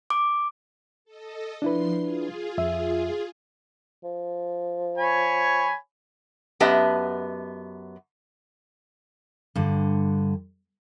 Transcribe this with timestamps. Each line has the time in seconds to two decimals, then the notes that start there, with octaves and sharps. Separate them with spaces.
0.10 D6
1.05 A4 D#5
1.62 F3 D4 E4 B4 C6 C7
1.97 F4 G#4
2.58 F2 E5
4.04 F3
4.98 C#5 G#5 B5
6.60 F#2 B3 G4 D#5 E5 A5
9.55 G2 D3